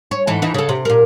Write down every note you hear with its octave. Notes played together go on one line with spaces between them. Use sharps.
C#5
G#2 E3 A4
D#2 E3 D#4
C#3 A4
C3
A#2 A#4